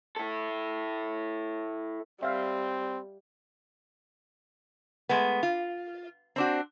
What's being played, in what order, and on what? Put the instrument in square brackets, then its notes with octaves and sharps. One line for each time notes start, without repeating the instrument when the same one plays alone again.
[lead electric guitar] E4 A4
[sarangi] G3 [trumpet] C4 [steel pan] E5 F5
[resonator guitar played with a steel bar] G#3 A3 B3
F4
C4 D4 F#4